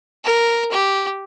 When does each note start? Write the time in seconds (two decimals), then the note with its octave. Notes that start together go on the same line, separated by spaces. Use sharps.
0.24 A#4
0.71 G4